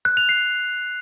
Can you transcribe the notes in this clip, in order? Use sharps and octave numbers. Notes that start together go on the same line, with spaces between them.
F#6
F7
C7